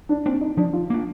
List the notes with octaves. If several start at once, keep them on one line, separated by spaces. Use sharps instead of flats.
D4
A#3 C4 D4
D#4
F3 D4
F4
A#3 D4